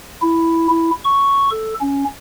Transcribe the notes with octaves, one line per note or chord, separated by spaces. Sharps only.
E4
E4
C#6
A4
C#4